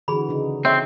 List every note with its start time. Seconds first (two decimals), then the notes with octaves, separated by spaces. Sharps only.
0.08 D3 E3 F#4 G#4 B5
0.29 C#3 D#4
0.65 C4 C#5 E5